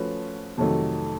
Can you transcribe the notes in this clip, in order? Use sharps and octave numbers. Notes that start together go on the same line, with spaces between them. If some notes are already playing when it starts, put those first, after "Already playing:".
Already playing: F3 A3 C#4 F#4 B4
F2 C3 D#3 F#3 A3